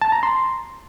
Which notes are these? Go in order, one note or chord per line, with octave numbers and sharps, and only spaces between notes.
A5
A#5
C6